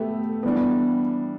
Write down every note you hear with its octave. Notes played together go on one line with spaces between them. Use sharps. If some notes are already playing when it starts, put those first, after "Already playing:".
Already playing: A3 B3 G4 E5
E3 G3 B3 D4